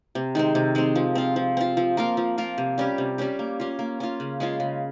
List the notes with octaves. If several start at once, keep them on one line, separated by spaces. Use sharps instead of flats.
C3
D#3 G#3 C4
C3
D#3 G#3 C4
F3
C4 F4
F3
C4 F4
F3
A#3 F4 A#4
F3
A#3 F4 A#4
C3
G3 C#4 G4
C3
G3 C#4 G4
A#3
C#4 F4
A#3
C#4 F4
C#3
G#3 C#4 F4
C#3